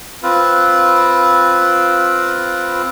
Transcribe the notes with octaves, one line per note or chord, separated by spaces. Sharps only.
C4 F4 B4